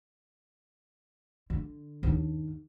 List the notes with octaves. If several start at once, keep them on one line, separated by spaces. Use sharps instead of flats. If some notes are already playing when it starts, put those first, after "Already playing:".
D3
D#2 D4